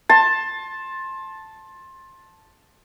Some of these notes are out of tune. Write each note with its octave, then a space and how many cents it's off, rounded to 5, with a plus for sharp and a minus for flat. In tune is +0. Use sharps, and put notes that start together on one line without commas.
A5 +0 C6 +25